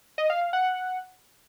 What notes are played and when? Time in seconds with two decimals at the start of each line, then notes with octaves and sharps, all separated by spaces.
0.18 D#5
0.30 F5
0.41 F5
0.53 F#5